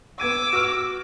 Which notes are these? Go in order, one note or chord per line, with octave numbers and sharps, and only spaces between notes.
B3 D6 E6 G#6 D#7
F#4 F6